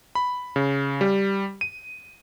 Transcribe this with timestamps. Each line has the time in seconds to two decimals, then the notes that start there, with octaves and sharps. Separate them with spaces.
0.15 B5
0.56 C#3
1.01 G3
1.61 D#7